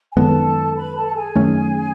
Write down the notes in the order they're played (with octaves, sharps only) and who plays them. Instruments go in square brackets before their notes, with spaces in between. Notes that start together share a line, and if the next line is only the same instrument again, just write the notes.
[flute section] G#5
[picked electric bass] F#2 D#3 G#3 B3 [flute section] A4 A5
[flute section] B4 B5
A4 A5
A5
G#4 G#5
[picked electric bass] F#2 D#3 A3 C#4